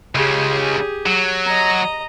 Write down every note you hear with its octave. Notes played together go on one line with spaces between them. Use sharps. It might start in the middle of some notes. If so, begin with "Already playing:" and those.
C#2 C#3 G4 G#4
F#3
D#5 A#5